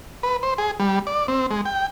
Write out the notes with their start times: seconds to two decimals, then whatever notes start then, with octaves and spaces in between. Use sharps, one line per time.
0.23 B4
0.43 C5
0.58 G#4
0.80 G3
1.07 D5
1.28 C4
1.51 G#3
1.65 G5